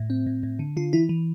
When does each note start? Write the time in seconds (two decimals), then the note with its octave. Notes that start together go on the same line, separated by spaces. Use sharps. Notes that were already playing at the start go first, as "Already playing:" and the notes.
Already playing: A2
0.10 C4
0.26 A2
0.43 A2
0.59 D3
0.77 D3 F4
0.93 E3 E4
1.09 E3